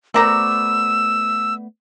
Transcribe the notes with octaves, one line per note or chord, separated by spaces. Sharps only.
F3 A3 B3 A#4 D5 A#5 E6